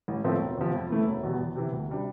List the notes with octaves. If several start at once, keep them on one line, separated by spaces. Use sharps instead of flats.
A1
A2 F3 A3 C4
E1
E2 C3 F3
F2
E3 A3 E4
E1
E2 B2 G3
E2
C3 E3
D2
C3 G3 D4